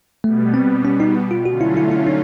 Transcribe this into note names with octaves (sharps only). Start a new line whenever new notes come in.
B2 G3 A3 B3
C4
C#4
D#4
F4
D3 F#3 A3 C#4 F4 F#4
E4
E4
E4
D#4